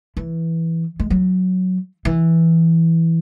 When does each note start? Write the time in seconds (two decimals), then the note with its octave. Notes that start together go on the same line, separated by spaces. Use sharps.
0.17 E3
1.00 G#3
1.10 F#3
2.05 E3